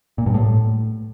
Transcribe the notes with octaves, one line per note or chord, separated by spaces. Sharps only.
A#2
G2
A2